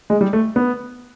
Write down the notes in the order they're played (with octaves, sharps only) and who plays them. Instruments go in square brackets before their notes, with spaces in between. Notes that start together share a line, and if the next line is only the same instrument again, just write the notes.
[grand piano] G#3
G3
A3
B3